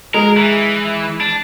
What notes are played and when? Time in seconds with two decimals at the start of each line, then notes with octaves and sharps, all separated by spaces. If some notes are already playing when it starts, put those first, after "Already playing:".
0.14 G#3 A#4
0.37 E3
1.20 D4